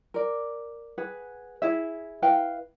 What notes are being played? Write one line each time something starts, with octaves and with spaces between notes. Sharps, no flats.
A#4 D5
G#4 B4 F#5
E4 G#4 E5
E4 B4 F5 G5